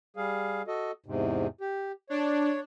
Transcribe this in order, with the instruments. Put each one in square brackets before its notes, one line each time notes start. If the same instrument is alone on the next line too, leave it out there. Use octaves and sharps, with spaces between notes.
[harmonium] G3 G#4 F5
F#4 A4 D#5
E2 G#2 C3
G4
[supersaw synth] D4 [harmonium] C#5